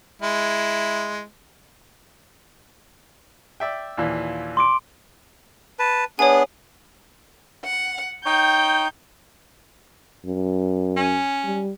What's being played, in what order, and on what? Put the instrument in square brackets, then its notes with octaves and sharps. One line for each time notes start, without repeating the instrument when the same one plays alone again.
[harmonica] G#3 E4
[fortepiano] D5 E5 G5
D#2 A#2 E3
[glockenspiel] C6 D6 D7
[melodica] B4 A5
[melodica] B3 D4 G#4 [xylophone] C#5 G#5
[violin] F#5
[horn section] D#4 C#5 G5 [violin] G6
[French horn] F#2
[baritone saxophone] C#4
[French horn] G3